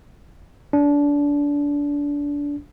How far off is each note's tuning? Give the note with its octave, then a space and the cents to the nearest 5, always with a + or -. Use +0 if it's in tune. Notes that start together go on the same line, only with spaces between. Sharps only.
D4 -25